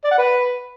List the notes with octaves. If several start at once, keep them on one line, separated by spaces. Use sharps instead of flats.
D5
F#5
B4